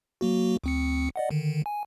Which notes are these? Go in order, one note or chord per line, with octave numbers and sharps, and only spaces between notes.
F#3 A#3 F#4
D2 C4 C#7
D5 D#5 F#5
D3 D#3
G#5